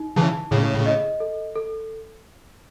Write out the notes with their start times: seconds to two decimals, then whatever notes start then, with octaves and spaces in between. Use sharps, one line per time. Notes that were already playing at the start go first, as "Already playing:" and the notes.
Already playing: D#4
0.16 C#3 E3 A5
0.51 A2 C#3 G#4
0.86 D#5
1.20 A4
1.56 A4